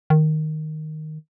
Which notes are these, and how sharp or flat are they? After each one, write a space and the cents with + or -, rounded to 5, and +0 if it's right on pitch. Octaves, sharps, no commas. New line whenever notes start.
D#3 -5